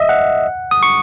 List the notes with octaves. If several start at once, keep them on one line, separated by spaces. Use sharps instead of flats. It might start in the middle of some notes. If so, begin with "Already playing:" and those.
Already playing: D#5 E5
F#5
D#6
C#6